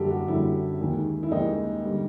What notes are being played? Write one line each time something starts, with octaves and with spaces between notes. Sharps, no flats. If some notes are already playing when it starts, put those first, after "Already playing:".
Already playing: F#2 D3 G3 G4 A4
F#4
F#2 D3 G3 E4
D#2 D#3 G#3
E4
D#2 D#3 G#3 D#4
D3 G3